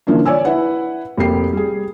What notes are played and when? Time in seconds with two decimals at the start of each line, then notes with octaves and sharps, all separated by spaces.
0.07 D3 E3 F3 A#3 C#4 D4
0.26 C#5 D5 G#5 E6
0.45 E4 B4 F#5
1.17 F1 A#3 G4 C7
1.53 G3 G#4